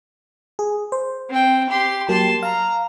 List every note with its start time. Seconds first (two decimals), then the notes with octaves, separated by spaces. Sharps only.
0.59 G#4
0.92 C5
1.30 C4 G5
1.69 G4 C6
2.09 F#3 A#3 G4 A5 C6
2.43 F5 A#5